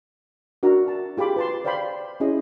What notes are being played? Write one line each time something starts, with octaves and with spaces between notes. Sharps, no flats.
D4 F#4 A#4 E5 A#5
A5
F4 G4 G#4 B5 D6
B4 A5 C6
C5 D5 F5 G5 B5 C6
C#4 E4 G#4 D#5